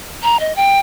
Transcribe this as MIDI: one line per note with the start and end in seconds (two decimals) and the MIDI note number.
0.23 0.40 82
0.40 0.55 75
0.56 0.80 79